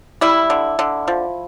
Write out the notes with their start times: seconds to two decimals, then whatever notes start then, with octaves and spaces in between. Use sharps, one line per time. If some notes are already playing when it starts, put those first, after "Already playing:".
0.21 G3 E4
0.50 D3
0.79 D3
1.08 F3